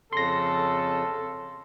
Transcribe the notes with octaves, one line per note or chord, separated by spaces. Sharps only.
F2 C#3 A4 C6 A#6